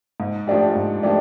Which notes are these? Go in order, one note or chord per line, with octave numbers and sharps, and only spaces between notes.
G#2
F3 A3 D4 G4
G#2
F3 A3 D4 G4